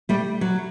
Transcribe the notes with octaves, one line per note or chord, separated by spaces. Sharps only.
G3 A3
F#3